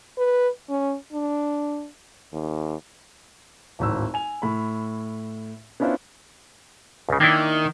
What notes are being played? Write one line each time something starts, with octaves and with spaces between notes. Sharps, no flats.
B4
C#4
D4
D#2
D1 G#1 E6
G#5 F7
A2 B5
B3 C#4 D4 E4 F4 C5
C#2 C#3
D#3 A#3 D4 E4